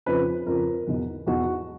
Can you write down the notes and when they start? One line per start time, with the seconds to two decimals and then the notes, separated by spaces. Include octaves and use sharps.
0.06 F2 C#3 F3 B4
0.46 F2 C#3 F3 A#4
0.87 E2 B2
1.26 E2 B2 F#4